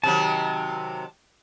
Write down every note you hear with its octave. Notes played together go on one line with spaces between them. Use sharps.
C3 D#3 F#3 A5